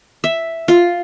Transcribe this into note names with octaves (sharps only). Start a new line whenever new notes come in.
E5
F4